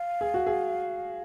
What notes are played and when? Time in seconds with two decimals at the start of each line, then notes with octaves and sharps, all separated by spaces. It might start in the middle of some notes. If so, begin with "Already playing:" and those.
Already playing: F5
0.21 G#4
0.34 F#4
0.47 G#4